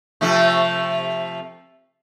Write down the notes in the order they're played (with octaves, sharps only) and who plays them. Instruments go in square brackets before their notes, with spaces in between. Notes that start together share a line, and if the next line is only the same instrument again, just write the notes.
[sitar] C3 F3 A3